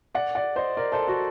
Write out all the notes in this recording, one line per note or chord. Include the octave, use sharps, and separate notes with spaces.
D5 F#5
D5 F#5
C5 D#5
A#4 D5
A4 C5
F#4 A4